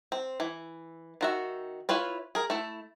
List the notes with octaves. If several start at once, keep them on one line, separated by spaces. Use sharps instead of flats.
C4
E3
D#3 F#4 E5
E4 F4 B4 C#5
G#4 A#4
A3 E4